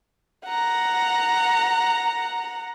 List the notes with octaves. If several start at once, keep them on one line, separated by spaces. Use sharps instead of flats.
F#5 A#5